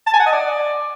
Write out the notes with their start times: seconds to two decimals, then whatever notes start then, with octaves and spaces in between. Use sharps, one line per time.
0.07 A5
0.13 G#5
0.20 F#5
0.26 D#5
0.33 D5